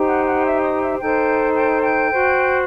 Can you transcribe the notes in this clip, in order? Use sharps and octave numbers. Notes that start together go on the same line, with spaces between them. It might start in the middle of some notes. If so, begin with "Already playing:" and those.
Already playing: D#4 G4 C5
F#5 F#6
F#5 F#6
E5 E6
D#5 D#6
E5 E6
D#4 A4 C5 G5 G6
G5 G6
G5 G6
F#4 C5